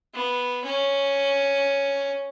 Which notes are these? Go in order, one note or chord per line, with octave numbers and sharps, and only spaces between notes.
B3
C#4